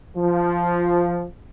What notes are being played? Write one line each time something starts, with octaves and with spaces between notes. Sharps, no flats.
F3